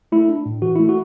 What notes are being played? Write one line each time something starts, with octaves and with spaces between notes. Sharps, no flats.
A3 E4
D4
A2
E3 F#4
A3 E4
F#4